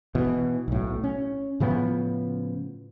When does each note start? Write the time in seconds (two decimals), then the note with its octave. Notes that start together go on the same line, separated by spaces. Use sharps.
0.15 B2 E3
0.68 B1 A2
1.04 C#4
1.60 A2 C#3 F3 B3